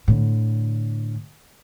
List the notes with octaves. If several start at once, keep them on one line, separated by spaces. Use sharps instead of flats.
A2 D3